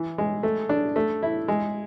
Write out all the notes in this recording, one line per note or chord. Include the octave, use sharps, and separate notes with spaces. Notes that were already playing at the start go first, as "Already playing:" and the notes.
Already playing: E3
G#3
A3
D4
A3
E4
G#3